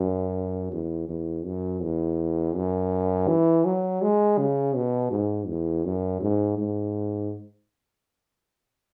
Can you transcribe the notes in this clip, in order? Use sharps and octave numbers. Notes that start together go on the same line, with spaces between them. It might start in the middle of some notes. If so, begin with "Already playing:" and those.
Already playing: F#2
E2
E2
F#2
E2
F#2
E3
F#3
G#3
C#3
B2
G#2
E2
F#2
G#2
G#2